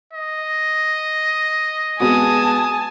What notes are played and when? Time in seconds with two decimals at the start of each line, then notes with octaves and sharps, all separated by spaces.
0.13 D#5
2.00 G#3 B3 F#4 G#5 A5 D#6